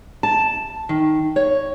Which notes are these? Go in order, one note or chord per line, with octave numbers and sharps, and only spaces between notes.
A5
D#3
C#5